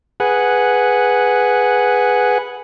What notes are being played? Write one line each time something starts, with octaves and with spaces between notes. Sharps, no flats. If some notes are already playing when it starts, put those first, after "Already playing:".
G#4 B4 F#5